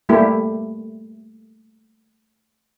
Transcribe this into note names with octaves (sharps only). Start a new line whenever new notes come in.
G3 A3 A#3 E4 G4